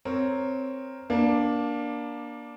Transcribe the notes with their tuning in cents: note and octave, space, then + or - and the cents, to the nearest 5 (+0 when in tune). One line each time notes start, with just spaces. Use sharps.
C4 +0 A#4 +0 C#5 +0
A#3 +20 D4 +0